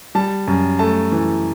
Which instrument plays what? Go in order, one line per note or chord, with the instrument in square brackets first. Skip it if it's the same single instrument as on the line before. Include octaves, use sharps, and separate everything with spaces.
[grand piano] G3 A5
F#2
A3 A5
E3